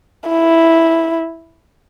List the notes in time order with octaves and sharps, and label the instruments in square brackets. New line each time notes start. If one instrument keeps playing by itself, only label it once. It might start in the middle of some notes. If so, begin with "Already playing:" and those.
[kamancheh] E4